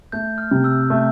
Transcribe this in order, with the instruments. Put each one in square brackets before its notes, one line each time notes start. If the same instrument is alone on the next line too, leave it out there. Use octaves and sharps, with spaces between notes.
[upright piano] A3 [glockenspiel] G6
[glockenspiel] F6
[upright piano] C3
[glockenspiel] E6
[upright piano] A3